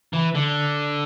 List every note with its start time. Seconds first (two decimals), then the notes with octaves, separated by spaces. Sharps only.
0.13 E3
0.35 D3